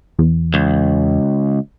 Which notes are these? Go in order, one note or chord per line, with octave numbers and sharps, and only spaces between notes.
E2
C#2